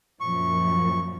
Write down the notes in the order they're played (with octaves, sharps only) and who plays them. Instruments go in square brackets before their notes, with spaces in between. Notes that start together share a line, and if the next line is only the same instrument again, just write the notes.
[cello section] F#2 A#2 F3 [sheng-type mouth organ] C#6